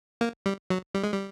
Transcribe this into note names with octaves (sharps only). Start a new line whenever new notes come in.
A#3
G3
F#3
G3
G#3
G3